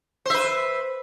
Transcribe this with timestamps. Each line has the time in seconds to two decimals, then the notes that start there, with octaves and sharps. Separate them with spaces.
0.25 C5
0.30 E5
0.34 B4